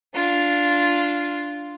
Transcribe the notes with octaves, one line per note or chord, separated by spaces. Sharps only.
D4 F4